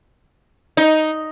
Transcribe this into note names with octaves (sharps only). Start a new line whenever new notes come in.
D#4